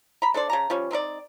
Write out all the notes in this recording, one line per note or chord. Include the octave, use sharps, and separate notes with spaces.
A#5 B5
D4 A4 C5 D5
C#3 A5 A#5
F3 G3 C#4
C4 D#4 A#4 D5